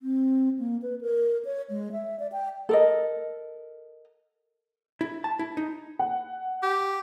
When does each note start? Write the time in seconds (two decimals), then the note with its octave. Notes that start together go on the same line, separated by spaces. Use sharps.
0.02 C4
0.59 A#3
0.82 B4
1.01 A#4
1.45 C#5
1.70 G#3
1.92 E5
2.19 D5
2.32 G5
2.69 A4 A#4 D#5
5.01 E4
5.24 A5
5.39 E4
5.57 D#4
5.99 F#5
6.62 G4